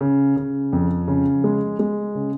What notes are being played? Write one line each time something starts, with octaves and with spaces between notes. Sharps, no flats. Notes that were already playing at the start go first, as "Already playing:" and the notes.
C#3
C#3
F2
C#3
G#3
G#3
C#3